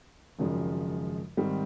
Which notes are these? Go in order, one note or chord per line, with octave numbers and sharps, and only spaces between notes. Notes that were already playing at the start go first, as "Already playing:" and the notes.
G#1 F#2 C#3 F3 G#3
G#2 D#3 G3 C4